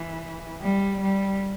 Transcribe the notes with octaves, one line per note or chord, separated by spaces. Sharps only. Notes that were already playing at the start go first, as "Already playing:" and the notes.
Already playing: E3
G3
G3